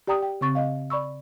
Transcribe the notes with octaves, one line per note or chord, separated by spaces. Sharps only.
G4 D5 G5 A#5 D#6
G5
C#3 C4 C#6 A6
D#5 F5
D5 B5 C#6 E6